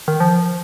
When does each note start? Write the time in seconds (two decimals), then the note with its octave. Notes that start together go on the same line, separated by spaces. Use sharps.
0.08 D#3
0.20 F3